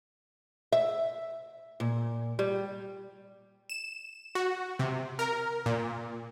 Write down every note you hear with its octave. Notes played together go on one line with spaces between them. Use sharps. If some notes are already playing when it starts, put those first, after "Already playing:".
E5
A#2
G3
E7
F#4
C3
A#4
A#2